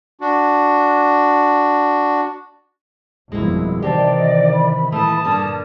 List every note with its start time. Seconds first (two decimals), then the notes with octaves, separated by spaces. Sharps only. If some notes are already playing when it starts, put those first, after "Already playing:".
0.21 D4 F#4
3.32 G1 F2 B2 G#3 A#3 E4
3.82 C3 D#3 E3 C4 G4 D5 A5
4.16 D#5
4.52 B5
4.92 A#2 E3 A3 A5 D#6
5.24 G2 D3 G3 A#4